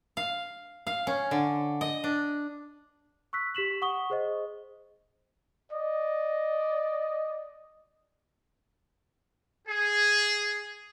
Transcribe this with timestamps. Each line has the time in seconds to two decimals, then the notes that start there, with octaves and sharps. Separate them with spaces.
0.17 F5
0.87 F5
1.07 C#4
1.31 D3
1.81 D#5
2.04 D4
3.33 C#6 E6 F#6 B6
3.55 G4 B6 E7 F#7
3.82 F#5 C#6 D#6 G7
4.10 G#4 C5 D#5
5.71 D5 D#5
9.68 G#4